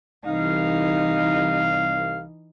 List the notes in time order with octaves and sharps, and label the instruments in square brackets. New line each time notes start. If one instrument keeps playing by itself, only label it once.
[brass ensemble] C2 F5 [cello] E3 D#4